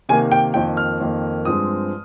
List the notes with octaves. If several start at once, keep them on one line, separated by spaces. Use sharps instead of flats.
C3 D#3 A#3 G#5
G5
F2 D#3 A#3 G5
F6
F2 D#3 A#3
G2 F3 G#3 C4 D#6